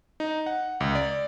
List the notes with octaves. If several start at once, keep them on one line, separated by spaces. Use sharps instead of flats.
D#4
F#5
C#2
D5